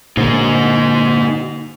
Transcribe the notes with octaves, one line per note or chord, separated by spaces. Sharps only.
A#2 D3 A#3 D#4 C5